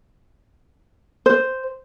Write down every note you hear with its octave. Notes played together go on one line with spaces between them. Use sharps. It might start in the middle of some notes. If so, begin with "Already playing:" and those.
C5